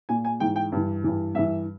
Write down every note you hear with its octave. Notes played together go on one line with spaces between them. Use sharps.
A#2 G#5
G#5
G#2 E3 G5
G5
G2 E3
G2 E3
G2 E3 E5